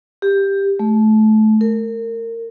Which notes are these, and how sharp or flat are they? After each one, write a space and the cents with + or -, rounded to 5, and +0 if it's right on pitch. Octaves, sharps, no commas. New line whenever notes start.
G4 +5
A3 -25
A#4 -30